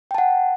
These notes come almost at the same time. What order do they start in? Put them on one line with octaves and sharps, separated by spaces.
G5 A5 F#5